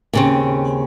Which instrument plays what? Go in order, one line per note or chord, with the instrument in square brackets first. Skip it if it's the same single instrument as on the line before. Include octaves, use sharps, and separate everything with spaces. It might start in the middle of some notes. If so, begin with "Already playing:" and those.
[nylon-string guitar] D#2 C#3 C4